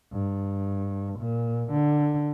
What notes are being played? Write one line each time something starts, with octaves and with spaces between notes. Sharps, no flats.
G2
A#2
D3